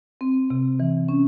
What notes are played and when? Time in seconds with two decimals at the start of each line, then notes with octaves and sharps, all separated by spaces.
0.21 C4
0.50 C3
0.80 E3
1.09 C#4